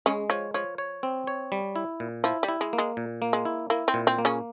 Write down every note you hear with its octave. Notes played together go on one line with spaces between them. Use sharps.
C#3 G#3 C#4
F3 C#5
F3 C#5
C#5
C4
C#5
G3
E4
A#2
F3 E4
G3
E4
G#3
A#3
G#3
A#2
A#3
G#3
E4
A#3 E4
C4
A#2
C4
A#3
C#3 C#4